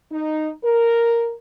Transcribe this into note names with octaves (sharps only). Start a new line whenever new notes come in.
D#4
A#4